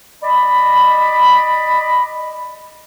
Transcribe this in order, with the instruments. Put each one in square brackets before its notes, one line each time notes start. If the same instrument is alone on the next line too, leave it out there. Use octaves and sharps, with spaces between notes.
[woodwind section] D5 D#5 B5